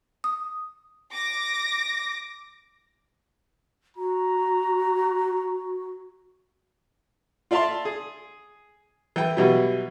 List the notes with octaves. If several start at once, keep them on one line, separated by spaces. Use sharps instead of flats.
D#6
D6 A#6
F#4 A#5
F4 D5 E5 F5 A5 C6
G#4
E3 G5
B2 E3 F#3 G3